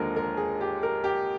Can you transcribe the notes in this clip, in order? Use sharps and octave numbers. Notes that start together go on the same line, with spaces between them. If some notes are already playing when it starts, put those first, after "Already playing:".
Already playing: D#2 D3 F3 G#3 A#4
A#4
G#4
G4
A#4
G4